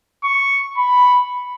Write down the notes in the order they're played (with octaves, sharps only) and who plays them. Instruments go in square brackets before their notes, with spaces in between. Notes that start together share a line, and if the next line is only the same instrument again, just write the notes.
[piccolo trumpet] C#6
B5